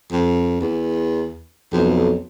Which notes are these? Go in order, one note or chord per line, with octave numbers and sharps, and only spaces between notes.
F2
E2
B1 F2